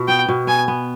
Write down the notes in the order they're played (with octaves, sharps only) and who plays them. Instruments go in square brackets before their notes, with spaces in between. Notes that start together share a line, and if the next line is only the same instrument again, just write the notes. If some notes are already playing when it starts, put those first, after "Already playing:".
Already playing: [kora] B2 F4
[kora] B3 [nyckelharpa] G5
[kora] B2
[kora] B3 [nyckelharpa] G#5
[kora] B3